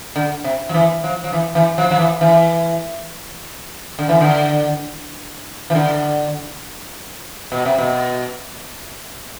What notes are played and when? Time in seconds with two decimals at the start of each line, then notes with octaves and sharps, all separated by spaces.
0.16 D3
0.44 C3
0.69 F3
0.74 E3
1.04 F3
1.24 F3
1.33 E3
1.55 E3
1.78 F3
1.91 F3
1.99 E3
2.21 E3
3.99 D3
4.09 E3
4.21 D3
5.70 E3
5.75 D3
7.52 B2
7.66 C3
7.78 B2